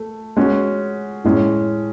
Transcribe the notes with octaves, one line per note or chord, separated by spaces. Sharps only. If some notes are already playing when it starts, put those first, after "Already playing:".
Already playing: A3
G#3 C#4 F#4
A2 G#3 C#4